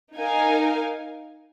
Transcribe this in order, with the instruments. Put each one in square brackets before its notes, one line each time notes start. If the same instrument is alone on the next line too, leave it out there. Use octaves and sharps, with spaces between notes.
[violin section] D#4 A#4 F5 G#5